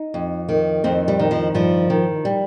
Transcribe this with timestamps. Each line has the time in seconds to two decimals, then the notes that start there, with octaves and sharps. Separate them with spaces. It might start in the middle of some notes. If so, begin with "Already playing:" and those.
Already playing: D#4
0.14 F2
0.49 D#3
0.84 F2 C4
1.08 G3
1.19 D#3
1.31 F3
1.54 G2 F3
1.90 D#3
2.25 G3